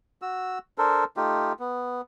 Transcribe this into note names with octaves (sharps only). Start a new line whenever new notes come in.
F#4 E6
D4 A4 A#4 C5
A3 D#4 F4 G4
B3